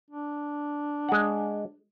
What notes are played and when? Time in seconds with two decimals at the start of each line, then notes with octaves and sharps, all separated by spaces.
0.10 D4
1.09 G#3 F#5